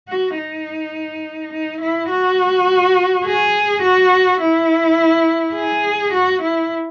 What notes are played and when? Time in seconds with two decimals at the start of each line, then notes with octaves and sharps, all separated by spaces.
0.09 F#4
0.37 D#4
1.52 D#4
1.81 E4
2.10 F#4
3.26 G#4
3.82 F#4
4.41 E4
5.55 G#4
6.13 F#4
6.42 E4